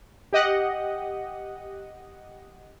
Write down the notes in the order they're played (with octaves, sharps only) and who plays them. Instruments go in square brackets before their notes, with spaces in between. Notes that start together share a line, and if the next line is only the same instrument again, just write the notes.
[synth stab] G4 D#5 F#5